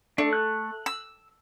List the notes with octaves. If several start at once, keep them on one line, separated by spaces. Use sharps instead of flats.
A3 D4
F#6
E6